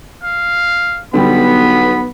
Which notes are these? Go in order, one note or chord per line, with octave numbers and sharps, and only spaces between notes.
F5
B1 D3 G3 B3 B5